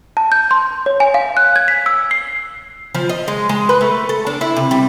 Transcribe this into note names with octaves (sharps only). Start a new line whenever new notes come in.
A5
G6
C6
C#5
G#5
F5
F#6
G#6
B6
E6
C7
F3
D#5
G#3
G#3
B4
A3
A4
D4
E4
C3
G3